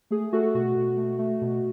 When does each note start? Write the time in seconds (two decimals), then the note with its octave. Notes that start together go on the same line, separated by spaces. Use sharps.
0.11 A3 G#4
0.33 A3 F#4 A4
0.55 B2 F#4
0.76 B2
0.97 A3
1.19 A3
1.41 B2